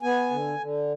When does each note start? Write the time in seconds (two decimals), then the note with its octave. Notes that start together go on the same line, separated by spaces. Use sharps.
0.03 B3 G#5
0.31 D3
0.59 D3